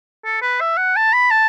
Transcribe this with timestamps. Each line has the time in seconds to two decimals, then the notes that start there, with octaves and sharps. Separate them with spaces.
0.25 A4
0.42 B4
0.61 E5
0.77 F#5
0.96 A5
1.13 B5
1.31 A5